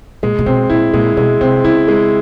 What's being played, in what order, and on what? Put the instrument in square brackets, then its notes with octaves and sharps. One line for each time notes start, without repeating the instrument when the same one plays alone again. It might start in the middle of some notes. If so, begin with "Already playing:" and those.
[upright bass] A#2 [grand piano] G#3
[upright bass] A#2
[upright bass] B2 [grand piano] C4
[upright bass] A#2 [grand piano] E4
[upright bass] A#2 [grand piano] G#3
[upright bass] B2 [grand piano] G#3
[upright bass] C3 [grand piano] C4
[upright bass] C#3 [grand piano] E4
[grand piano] G#3